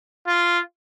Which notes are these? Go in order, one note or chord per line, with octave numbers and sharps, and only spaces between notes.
F4